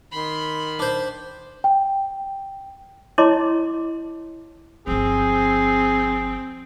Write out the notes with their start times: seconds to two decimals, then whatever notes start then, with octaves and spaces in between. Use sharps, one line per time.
0.12 D#3 B5 C6
0.79 D4 C5
1.64 G5
3.18 E4 C#5 D#5 A5 C6 D6
4.87 G1 F3 C4 G#4